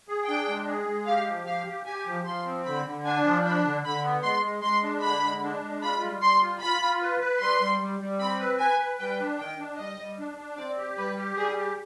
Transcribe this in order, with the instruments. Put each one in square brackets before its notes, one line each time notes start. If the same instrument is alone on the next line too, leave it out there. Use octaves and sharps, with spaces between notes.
[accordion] G#4
[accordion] D4 [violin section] G5
[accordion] G#3
G#4
G#3
[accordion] G4 [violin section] F5
[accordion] F3
[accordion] G4 [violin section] F5
[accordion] G4
[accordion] G4 [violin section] G#5
[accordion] F3
[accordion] F3 [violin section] C6
[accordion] C4
[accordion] D3 [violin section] B5
[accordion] D3
[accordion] D4 [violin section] G#5
[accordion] F3
[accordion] D4 [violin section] B5
[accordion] D3
[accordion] D3 [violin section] B5
[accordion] B3
[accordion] G#3 [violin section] C6
[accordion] G#3
[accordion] G#3 [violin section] C6
[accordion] D4
[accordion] D3 [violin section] B5
[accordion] G#3
D4
G#3
[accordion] F4 [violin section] B5
[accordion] G3
[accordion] G3 [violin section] C6
[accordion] F4
[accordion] F4 [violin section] B5
[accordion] F4
B4
B4
[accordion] G3 [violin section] C6
[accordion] G3
G3
G3
[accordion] C4 [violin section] B5
[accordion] B4
[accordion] B4 [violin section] G#5
[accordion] B4
[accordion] G3 [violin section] G5
[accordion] D4
[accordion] D#3 [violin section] G5
[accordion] D4
[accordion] G3 [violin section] D#5
[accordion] G3
D4
D4
[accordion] C4 [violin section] D5
[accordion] G4
[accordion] G3 [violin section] B4
[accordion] G4
[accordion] G3 [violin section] G#4
[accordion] G4